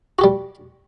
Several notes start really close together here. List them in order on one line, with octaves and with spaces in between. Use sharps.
F#4 G4 G3